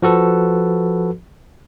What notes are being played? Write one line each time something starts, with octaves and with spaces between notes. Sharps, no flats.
F3 F#4 A4 B4